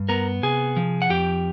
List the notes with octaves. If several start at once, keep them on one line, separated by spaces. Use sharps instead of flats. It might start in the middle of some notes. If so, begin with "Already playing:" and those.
Already playing: G2
B3 A#4 A#5
C3 G#4 G#5
F3
F#5
F2 G4 G5